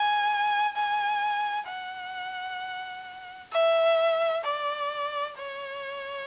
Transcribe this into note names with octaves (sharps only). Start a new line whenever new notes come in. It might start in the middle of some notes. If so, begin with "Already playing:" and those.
Already playing: G#5
G#5
F#5
E5
D5
C#5